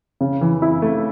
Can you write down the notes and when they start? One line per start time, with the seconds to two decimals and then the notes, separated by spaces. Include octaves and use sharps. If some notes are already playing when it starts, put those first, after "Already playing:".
0.21 C#3
0.41 E3
0.62 E4
0.82 A3